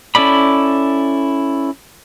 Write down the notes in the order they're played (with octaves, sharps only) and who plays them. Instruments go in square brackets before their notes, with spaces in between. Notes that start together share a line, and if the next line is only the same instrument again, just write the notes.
[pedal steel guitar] C#4 E4 A4 D5 B5